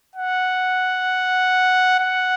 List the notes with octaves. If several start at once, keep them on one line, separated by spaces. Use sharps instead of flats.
F#5
F#5